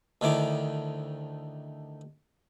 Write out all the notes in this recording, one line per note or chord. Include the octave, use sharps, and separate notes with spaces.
D2 D3 D#3 E4 D6